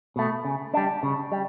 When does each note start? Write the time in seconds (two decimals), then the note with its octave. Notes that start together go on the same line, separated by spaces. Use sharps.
0.16 B2 A3
0.45 C#3
0.74 G3 D4
1.03 C#3
1.32 G3